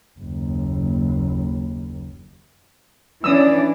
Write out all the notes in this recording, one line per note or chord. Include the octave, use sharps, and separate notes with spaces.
F#1 D#2
E3 C#4 D4 D5 D#6 E6